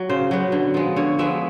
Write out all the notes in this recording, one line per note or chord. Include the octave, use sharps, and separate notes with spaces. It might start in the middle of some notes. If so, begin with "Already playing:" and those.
Already playing: F#3
C#3 C5
F#3 B3
D3
F3 G#3 B3
D3 C#5
F3 G#3 B3 E5